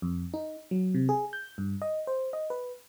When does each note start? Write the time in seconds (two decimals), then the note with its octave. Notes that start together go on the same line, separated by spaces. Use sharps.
0.02 F2
0.34 D#4
0.71 F#3
0.94 C3
1.09 G#4
1.33 G6
1.58 G2
1.82 D#5
2.07 C5
2.33 D#5
2.50 B4